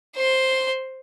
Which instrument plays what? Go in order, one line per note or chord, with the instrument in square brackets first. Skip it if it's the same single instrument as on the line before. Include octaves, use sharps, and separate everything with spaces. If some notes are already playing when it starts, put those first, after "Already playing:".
[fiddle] C5 C6